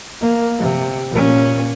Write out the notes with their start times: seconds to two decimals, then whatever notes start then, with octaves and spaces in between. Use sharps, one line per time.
0.21 A#3
0.59 C3
1.10 A#2 C#4